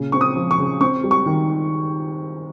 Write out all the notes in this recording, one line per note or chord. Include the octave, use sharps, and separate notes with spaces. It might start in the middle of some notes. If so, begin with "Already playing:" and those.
Already playing: A#2 C#3
C4 C#6
D#6
F3
C#6
C#3
C4 C#6
G3
C#6
D#3